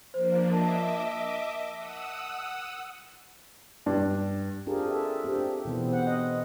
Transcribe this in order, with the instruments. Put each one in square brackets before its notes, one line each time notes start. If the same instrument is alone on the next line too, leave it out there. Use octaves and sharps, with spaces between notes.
[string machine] F3 A#3 D4 [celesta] C5
[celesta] A#4 A5 [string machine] D#5 E5 D6
[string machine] F#5 D#6 E6
[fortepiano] G2 [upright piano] D4
[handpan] C4 D4 F4 G4 G#4 A#4
A4 E5
C4 D4 G4
B2 E3 B3 C4
C5 F#5
D#5